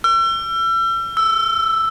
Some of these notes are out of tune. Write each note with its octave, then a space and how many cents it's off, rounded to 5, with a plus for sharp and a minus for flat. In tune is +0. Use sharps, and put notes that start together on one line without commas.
E6 +40
E6 +5